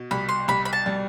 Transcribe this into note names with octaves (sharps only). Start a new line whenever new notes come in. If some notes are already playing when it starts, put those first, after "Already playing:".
Already playing: B2
C2 B5
C6
C2 B5
B5
A5
G3